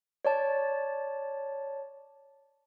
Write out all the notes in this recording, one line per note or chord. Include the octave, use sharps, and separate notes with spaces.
C#5 D5 A5